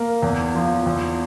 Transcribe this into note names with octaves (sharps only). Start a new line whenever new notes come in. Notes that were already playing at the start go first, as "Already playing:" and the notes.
Already playing: A#3
E2
F3
E2